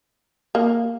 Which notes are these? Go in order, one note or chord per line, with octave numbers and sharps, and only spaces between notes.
A#3